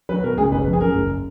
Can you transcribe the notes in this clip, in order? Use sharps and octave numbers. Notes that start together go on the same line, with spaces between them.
F#3 B4
B2 A#4
C#2 G#4
F#1 B4
F3
G#4
F#2 A#4
F#1